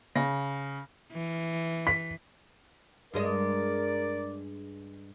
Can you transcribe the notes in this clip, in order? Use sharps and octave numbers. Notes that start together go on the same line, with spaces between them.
C#3 A#6
E3
B6
G2 G#3 A#4 D5 D#5